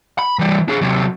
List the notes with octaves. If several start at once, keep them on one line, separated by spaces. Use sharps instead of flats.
B5
E3 G3
D4 G#4
C3 F#3